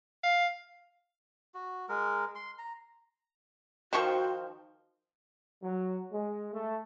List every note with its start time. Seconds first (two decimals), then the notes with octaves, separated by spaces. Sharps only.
0.23 F5
1.54 F#4
1.89 G#3 A#4
2.35 C6
2.59 A#5
3.93 D#3 F3 F#4 C5 G5 C#6
5.63 F#3
6.13 G#3
6.53 A3